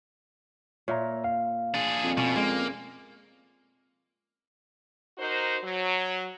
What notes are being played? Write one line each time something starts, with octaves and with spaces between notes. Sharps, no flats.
A#2 C#5 E5 A#5
F5
D4 G#4
F2
B2 C#4 D5
G#3 A#3
D#4 F#4 A#4 C5
F#3